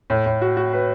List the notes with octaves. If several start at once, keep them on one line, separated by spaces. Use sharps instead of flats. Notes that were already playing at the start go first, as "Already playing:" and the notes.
A2
A2
F#4
F#4
B4